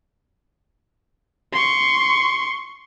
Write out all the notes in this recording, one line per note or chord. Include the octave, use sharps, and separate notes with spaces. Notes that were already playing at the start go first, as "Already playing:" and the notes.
C6 C#6